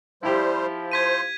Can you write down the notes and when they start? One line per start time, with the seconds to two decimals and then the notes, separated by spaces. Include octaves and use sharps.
0.23 F3 G3 E4 G4 C5
0.92 C5 G#6 B6 D#7